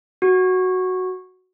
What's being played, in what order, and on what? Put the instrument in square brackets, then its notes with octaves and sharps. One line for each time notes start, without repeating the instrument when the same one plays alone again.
[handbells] F#4